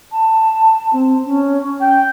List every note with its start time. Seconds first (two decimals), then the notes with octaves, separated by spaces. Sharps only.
0.12 A5
0.93 C4
1.26 C#4
1.80 G5